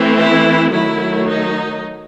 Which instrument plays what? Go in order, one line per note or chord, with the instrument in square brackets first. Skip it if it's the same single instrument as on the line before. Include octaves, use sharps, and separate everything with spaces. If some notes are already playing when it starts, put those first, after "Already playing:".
Already playing: [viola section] E3 A3 C4
E4
D#3 F#3 A3 E4
D#4